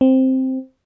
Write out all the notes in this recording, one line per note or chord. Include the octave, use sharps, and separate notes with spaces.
C4